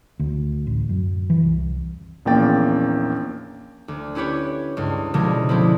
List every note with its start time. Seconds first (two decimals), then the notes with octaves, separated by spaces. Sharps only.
0.19 D2
0.67 A1
0.89 F#2
1.30 E3
1.43 C2
2.25 A#1 E2 A#3 C#4 G5 A6
3.88 D2
4.15 C#4 E4 G4 B4 C#5
4.77 C#2 G2
5.14 C#2 B2 D3 F3 G#3
5.49 D3 F3 G#3 A3 C4 E4